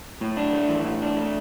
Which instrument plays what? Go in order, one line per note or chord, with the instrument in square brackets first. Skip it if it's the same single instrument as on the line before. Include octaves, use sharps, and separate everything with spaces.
[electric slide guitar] A2
D4
A3
E3
A2
D4
A3